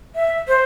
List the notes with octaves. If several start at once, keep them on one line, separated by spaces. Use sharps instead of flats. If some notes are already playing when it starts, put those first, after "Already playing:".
E5
C5